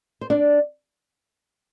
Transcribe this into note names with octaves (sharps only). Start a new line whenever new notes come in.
C5
D4 D5